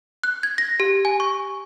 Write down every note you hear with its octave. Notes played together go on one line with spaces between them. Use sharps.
F#6
G#6
A#6
G4
G#5
C#6